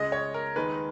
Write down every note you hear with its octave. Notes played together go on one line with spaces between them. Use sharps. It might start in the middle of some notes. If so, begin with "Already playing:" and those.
Already playing: C#2 C#3 G#3 D#5
C#5
A#4
D#2 D#3 G#3 D#4 B4